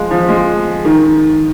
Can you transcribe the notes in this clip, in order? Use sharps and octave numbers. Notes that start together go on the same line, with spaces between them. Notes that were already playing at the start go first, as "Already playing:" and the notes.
Already playing: F3 G#3
F3
G#3
D#3